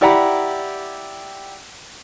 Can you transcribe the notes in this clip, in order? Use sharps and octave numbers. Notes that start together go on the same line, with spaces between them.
E4 G4 D5 F#5 A#5 B5